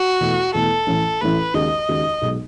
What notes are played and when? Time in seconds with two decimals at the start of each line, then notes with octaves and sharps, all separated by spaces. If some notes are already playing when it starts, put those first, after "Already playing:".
Already playing: F#4
0.21 E2 B2 A3
0.54 E2 B2 A3 A4
0.87 A1 A2 E3 A3
1.21 A1 A2 E3 A3 B4
1.54 D#2 C#3 G#3 D#4 F#4 D#5
1.89 D#2 C#3 G#3 D#4 F#4
2.22 B1 B2 G#3